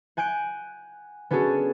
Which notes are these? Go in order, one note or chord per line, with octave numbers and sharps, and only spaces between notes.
F#5 G#5 F#6 G6 D7
B3 C#4 D4 F#4 G#4 A4